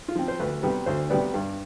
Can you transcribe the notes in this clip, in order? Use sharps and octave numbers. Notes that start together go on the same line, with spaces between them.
F4
F3 C4
C5
D2 B4
C3 G3 B3
D2 C5
C3 G3 B3 D5
G2